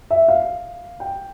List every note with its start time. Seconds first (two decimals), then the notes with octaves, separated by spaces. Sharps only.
0.10 E5
0.28 F5
1.00 G5